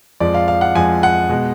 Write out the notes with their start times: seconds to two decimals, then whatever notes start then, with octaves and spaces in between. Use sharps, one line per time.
0.20 F2 F3 G#3 D5
0.34 F5
0.48 F5
0.61 F#5
0.75 F2 F3 G#3 G#5
1.03 F#5
1.29 B2 G#3